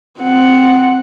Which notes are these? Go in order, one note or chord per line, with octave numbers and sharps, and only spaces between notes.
C4 F#5